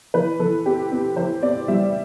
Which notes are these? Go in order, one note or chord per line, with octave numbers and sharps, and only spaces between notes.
E3 B4
E3 A4
C4 G4
C4
E3 C5
C4 D5
G3 E5